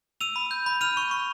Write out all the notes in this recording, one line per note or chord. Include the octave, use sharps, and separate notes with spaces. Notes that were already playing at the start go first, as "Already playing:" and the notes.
E6 D#7 F7
B5
G6
B5
F6 D#7 F7
C#6
C#6